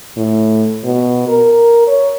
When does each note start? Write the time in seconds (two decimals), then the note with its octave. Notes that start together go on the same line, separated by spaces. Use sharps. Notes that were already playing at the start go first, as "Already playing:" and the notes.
0.17 A2
0.84 B2
1.28 A#4
1.87 C#5